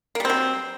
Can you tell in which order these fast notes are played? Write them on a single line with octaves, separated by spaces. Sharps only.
A#3 G3 C4 F#3